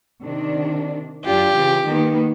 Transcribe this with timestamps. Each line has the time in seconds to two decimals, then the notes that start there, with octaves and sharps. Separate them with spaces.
0.23 C3 D#3 D4
1.25 F#2 D4 F4 G4
1.56 C#3 E3
1.85 D#3 A#3 B3